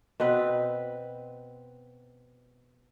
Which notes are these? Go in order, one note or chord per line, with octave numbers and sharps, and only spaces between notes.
B2 C4 B4